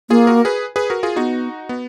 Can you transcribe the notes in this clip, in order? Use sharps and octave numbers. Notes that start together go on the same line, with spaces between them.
A#3 F4 G#4
F#4 A#4
G#4 B4
G#4 B4
F#4 A#4
F4 G#4
B3 D#4 F#4
B3